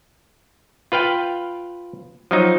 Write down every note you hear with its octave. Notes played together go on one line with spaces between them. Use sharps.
F4 B4 F5 G5
F3 F#3 D#4